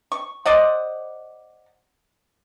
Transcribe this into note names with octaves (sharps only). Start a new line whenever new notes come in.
C#6
C5 D5 D#5 F#5